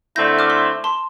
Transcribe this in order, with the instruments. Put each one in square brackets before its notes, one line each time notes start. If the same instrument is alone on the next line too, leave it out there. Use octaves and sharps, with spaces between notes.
[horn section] D3 A3 C4 E4 [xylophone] G6 A#6
[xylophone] D6 F6
C6 E6
A5 C6